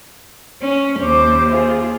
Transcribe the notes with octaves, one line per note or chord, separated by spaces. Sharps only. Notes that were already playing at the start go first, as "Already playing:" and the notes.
C#4
D#2 C5 D6
F4 G#4